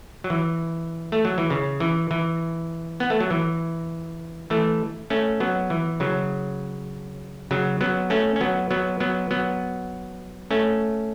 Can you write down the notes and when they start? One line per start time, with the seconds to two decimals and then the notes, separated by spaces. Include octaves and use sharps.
0.24 F#3
0.30 E3
1.12 A3
1.25 F#3
1.38 E3
1.50 C#3
1.80 E3
2.11 E3
3.00 B3
3.10 A3
3.20 F#3
3.30 E3
4.50 E3 A3
5.10 A3 C#4
5.40 F#3 B3
5.70 E3
6.00 C#3 F#3
7.51 C#3 F#3
7.81 F#3 B3
8.10 A3 C#4
8.36 C#4
8.41 F#3 B3
8.71 F#3 B3
9.00 F#3 B3
9.31 F#3 B3
10.51 A3 C#4